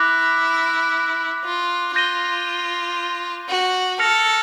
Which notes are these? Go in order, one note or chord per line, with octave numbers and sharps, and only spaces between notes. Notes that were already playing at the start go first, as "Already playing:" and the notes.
Already playing: E4 D6 F#6 A#6
F4
F4 G6 A#6 D#7 G7
F#4
A4 F6 A#6 C#7 F7